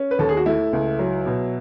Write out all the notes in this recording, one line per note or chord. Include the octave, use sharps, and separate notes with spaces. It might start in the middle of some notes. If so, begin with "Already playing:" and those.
Already playing: C#4
B4
D#2 A4
G#4
F#4
A3 E4
C#2
F#3
B2